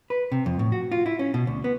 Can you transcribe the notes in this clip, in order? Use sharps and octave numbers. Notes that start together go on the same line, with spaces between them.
B4
C3
F2
A2
F#4
F4
E4
C#4
B2
D2
B3